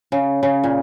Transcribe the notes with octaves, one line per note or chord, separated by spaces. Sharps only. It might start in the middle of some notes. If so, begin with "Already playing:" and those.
C#3
C#3
A#2